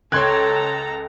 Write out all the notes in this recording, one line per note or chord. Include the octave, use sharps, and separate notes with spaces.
C#2 A4 C#5 G5 A#5 C6 F#6 G#6